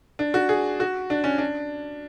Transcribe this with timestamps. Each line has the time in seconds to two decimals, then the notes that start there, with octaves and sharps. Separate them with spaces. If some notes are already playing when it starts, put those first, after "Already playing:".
0.19 D4
0.34 F#4
0.49 G#4
0.80 F#4
1.10 D4
1.24 C#4
1.38 D4